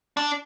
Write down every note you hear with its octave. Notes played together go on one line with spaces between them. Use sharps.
D4